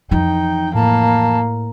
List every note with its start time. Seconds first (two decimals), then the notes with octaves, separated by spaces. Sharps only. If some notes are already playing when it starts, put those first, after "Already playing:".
0.11 F2 E3 D#4 G5
0.75 A2 A#3 A5